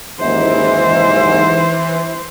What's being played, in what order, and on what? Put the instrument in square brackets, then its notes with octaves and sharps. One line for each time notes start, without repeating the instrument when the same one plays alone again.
[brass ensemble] F#1 D#2 G#2 [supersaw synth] E3 [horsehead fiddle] C5 [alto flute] E5